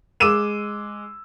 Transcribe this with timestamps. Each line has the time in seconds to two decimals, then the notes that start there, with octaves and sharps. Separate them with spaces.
0.20 G#3 D6 E6 D#7 E7